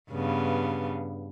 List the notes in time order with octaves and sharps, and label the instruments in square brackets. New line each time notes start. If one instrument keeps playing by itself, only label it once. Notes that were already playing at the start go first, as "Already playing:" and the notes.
[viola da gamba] G2 C#3 B3